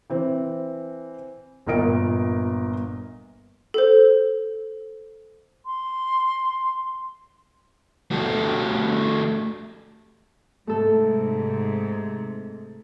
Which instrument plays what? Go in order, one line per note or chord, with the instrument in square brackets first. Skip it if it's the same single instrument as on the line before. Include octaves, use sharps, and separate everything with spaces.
[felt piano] E3 C4
G1 A#2 A#4 D#5 D7
[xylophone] A4 C5
[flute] C6
[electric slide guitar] A3 F#4 G4 A4
[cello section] G#2 C3 [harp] A3 A4